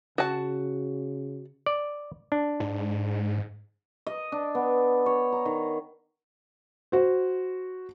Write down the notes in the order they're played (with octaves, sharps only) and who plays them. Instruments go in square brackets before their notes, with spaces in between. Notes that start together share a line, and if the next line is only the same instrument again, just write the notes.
[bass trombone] C#3 [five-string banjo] F#4 A5
[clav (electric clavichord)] D5
D4
[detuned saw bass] G#2
[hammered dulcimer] D#5
D4
B3
C#5
A#5
D#3
[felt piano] F#4 C5